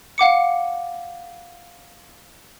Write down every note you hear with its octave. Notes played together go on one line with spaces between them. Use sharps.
F5 F#5 D6 C#7